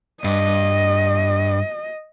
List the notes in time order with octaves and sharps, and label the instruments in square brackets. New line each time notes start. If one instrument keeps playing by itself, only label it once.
[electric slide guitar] G2 [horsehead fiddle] D#5